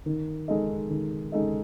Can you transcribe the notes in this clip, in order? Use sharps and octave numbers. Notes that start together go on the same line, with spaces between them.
D#3
G#3 D#4 A4 D#5
D#3
G#3 D#4 A4 D#5